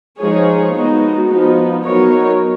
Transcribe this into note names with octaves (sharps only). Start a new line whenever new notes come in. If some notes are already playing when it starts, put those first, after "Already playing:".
F3 G#3 D#4 G#4 C#5
G#3 B3 D#4 F#4
F3 B3 D#4
F#3 B3 D#4 A#4 C#5